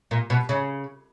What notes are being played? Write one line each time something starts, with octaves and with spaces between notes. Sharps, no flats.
A#2
B2
C#3